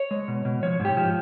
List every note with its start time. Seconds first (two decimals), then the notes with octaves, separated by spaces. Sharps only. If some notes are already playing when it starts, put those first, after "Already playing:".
Already playing: C#5
0.11 G#3
0.28 B2
0.45 B2
0.63 F3 C#5
0.80 G#2
0.85 G4
0.97 F3